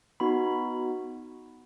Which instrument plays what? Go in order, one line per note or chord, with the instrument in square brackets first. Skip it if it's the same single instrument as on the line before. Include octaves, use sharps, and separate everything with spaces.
[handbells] B3 D#4 F#4 B5